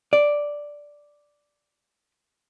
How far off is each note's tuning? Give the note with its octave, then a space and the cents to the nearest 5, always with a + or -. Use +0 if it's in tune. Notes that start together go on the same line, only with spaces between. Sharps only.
D5 +0